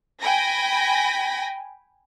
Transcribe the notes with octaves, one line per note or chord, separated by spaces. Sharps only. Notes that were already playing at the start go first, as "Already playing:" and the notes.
G5 G#5 B5 A#6